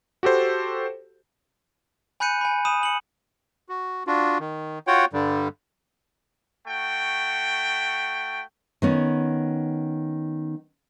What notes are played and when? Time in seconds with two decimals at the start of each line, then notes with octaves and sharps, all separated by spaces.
0.23 F#4 G4 A4 C5
2.20 G#5 B5 F#6 G6 C#7 D#7
2.41 G#5 B5
2.65 B5 D#6 D#7 E7
2.83 C#7 F#7
3.69 F#4
4.07 D4 F4 F#4
4.40 D#3
4.87 F4 F#4 C#5 F#5 G5
5.13 G2 D3 G3
6.68 A3 F#4 G5
8.82 D#3 B3 C#4